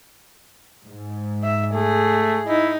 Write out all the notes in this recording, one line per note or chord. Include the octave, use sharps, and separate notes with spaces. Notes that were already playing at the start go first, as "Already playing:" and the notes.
G#2
E5
A3 G#4
D#4 E4